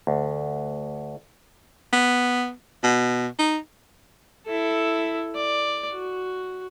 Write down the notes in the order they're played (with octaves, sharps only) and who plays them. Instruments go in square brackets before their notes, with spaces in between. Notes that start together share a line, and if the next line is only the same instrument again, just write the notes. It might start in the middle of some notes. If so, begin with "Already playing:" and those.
[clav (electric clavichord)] D2
[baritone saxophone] B3
B2
D#4
[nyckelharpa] E4 A4
D5
F#4